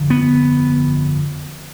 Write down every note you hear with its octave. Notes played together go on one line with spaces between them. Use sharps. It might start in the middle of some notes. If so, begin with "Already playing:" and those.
Already playing: G1 F2 D3
B3